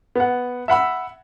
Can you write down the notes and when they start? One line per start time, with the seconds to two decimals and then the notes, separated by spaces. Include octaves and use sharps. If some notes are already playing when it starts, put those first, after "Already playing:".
0.15 B3 F#5
0.68 E5 F#5 B5 E6